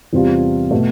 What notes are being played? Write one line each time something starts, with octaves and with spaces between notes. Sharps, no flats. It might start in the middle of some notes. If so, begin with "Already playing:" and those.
E2 C3 G3 C4 F4
B2 A3